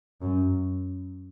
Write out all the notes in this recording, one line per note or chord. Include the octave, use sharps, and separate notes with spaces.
F#2